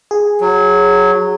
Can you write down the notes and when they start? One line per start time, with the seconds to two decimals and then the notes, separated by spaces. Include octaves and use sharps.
0.11 G#4
0.40 F#3